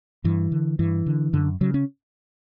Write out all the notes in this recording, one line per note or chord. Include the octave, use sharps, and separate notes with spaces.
G2 E3
D3
G2 E3
D3
F#2 D3
C#3 F#3
C#4